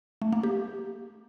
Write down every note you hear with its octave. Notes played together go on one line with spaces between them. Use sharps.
A3
A#3
G4